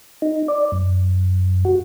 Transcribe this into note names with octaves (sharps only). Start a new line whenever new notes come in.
D#4
D5
F#2
F#4